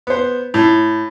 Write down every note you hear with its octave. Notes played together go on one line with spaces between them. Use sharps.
B3 C5
A2